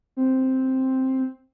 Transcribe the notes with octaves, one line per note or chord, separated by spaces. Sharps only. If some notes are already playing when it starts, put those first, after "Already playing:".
C4